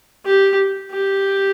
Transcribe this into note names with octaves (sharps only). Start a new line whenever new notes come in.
G4
G4